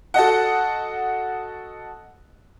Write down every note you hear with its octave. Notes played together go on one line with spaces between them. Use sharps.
F#4 A4 D#5 F#5